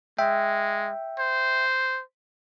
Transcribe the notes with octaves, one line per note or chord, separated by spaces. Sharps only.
G#3 E5 G5
C5